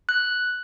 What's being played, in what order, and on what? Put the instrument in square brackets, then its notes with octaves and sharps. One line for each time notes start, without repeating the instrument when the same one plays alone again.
[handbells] F#6